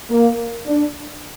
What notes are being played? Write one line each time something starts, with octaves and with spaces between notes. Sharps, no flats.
A#3
D4